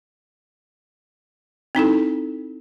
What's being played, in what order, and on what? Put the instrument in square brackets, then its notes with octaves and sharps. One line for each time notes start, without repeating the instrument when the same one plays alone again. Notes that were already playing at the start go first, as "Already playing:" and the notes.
[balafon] C4 D#4 E4 A4